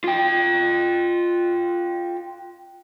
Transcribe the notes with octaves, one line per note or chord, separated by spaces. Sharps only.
F4 G5